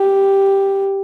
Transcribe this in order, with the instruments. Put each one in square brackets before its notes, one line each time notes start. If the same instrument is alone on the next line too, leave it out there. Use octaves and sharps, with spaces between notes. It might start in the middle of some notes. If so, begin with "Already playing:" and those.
Already playing: [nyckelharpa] G4